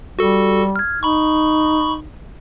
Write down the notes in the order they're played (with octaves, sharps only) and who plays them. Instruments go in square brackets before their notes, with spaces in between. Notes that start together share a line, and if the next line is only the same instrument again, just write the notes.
[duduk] G3 [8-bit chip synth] F#4 A4
[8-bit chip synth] F6 G#6
[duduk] D#4 [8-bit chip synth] B5 C#6